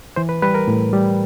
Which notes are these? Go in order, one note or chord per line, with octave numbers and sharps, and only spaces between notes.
E3 C5
B4
G3 B4
A#4
A2
G3